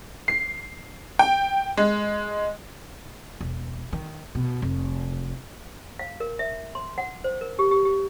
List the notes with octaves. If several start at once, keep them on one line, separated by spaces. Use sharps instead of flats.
C7
G5
G#3
E1
D#3
B2
F1
F5
A#4
E5
C6
F#5
C5
A#4
G4
G4
G4